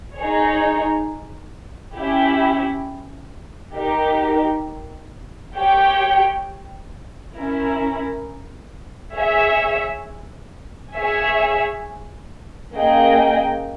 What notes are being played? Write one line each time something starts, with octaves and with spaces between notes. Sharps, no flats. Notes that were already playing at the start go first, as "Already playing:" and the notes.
D#4 G#4 C#5
C#4 E4 G4
D#4 G4 A#4
G4 C#5 G5
C#4 E4 A#4
G#4 C#5 E5
G#4 C#5 E5 G#5
A#3 C#4 G#4 D#5 G5